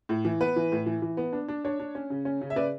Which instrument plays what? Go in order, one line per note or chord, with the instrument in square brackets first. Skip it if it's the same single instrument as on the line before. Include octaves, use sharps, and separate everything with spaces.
[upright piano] A2
E3
B3 B4
E3
A2
E3
E3
B3
D4
D4
D4 C#5
D4
C#4
C#3
C#4
C#3
E5
C#3 B4 D5